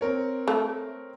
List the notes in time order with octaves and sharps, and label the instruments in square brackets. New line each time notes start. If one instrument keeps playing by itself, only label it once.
[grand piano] C4 A#4 C#5
[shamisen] A3